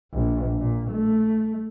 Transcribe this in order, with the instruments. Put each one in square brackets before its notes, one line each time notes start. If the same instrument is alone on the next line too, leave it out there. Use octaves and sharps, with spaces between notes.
[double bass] A#1
A#2
A3